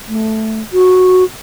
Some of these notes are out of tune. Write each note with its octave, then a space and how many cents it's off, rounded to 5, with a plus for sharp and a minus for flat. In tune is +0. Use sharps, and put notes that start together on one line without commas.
A3 +0
F#4 -10